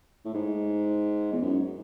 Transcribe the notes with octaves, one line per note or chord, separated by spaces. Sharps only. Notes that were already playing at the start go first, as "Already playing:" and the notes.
A2
G#2
E2
F#2